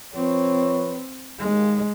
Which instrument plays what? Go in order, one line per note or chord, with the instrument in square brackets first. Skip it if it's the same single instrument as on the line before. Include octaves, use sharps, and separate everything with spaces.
[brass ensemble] F3 B4 C#5 [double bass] C4
[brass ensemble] D#2 [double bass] G#3